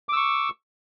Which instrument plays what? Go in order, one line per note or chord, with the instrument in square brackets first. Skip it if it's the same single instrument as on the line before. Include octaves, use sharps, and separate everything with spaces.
[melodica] D6
E6
C#6